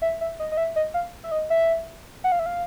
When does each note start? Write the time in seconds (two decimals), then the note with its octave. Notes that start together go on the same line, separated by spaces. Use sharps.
0.02 E5
0.21 E5
0.40 D#5
0.52 D#5
0.57 E5
0.76 D#5
0.94 F5
1.24 E5
1.31 D#5
1.50 E5
2.24 F#5
2.32 F5
2.39 E5
2.46 F5